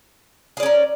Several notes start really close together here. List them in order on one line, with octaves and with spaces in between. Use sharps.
G#4 D5 C#4 A#4